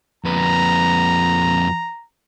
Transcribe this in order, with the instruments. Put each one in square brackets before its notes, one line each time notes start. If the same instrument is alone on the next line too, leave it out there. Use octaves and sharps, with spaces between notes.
[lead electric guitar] F2 B4 [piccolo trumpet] A#5